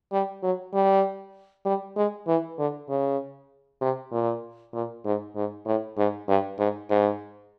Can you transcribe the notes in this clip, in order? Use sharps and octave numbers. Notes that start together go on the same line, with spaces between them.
G3
F#3
G3
G3
G#3
E3
D3
C#3
C3
A#2
A#2
G#2
G#2
A2
G#2
G2
G#2
G#2